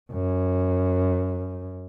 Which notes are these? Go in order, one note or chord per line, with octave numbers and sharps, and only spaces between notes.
F#2